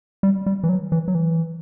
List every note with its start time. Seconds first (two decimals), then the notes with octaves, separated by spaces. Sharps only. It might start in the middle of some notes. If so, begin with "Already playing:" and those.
0.23 G3
0.46 G3
0.64 E3
0.69 F#3
0.92 E3
1.08 F#3
1.15 E3